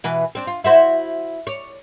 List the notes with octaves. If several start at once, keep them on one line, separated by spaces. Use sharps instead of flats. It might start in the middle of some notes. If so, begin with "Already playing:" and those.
B2 E3 B4
C4 D4
F4
E4 F#4 C5
C#5 D5